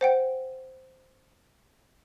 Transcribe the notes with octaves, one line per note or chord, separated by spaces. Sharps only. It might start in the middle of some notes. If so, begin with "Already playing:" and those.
C5 F#5 G5